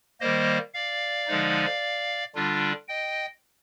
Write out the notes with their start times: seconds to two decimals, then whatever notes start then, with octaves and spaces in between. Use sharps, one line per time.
0.21 D#3 G3 A#3 C5 D#5
0.74 D5 F5
1.27 D3 F3 G#3 D#4
2.35 D3 G3 D4 F4
2.88 D#5 G5